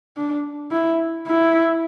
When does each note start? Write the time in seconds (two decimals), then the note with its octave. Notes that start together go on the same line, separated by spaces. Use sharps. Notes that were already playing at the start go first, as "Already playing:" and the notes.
0.17 D4
0.72 E4
1.27 E4